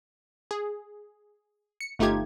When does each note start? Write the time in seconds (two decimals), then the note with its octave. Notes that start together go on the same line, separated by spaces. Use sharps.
0.51 G#4
1.81 C#7
1.99 G1 A3 D#4 F4 G4 G#6